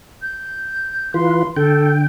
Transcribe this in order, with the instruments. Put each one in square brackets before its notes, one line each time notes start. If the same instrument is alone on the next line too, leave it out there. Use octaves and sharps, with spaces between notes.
[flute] G6
[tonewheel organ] E3 F4 B4 [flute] C6
[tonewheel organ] D3 G5 [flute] A4